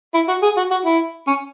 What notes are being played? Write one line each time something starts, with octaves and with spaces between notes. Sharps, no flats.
E4
F#4
G#4
F#4
F#4
E4
C#4